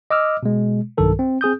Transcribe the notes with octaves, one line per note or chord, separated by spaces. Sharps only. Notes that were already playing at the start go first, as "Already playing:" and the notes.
D#5 D6 E6 F6
B2 G#3
B1 G2 D#3 A4 A#4
C4
C4 G#4 D#6 G6